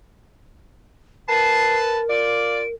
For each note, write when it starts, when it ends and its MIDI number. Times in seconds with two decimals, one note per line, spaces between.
1.29 2.74 70
1.29 1.99 71
1.29 1.99 81
1.29 1.78 96
2.10 2.62 65
2.10 2.62 74
2.10 2.66 98